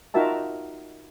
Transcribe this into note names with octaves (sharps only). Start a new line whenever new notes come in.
D#4 F4 F#4 A#4 E5 A5